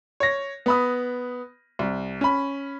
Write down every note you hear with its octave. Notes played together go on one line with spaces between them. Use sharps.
C#5 A#6
B3 B5 D#6
C2
C#4 B5